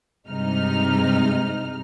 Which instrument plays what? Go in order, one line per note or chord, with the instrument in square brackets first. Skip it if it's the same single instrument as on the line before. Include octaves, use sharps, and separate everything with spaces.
[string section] G2 C3 G#3 D#4 F6